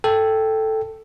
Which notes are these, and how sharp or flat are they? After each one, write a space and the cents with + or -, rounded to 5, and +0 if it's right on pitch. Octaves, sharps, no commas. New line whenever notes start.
A4 +0 G5 +0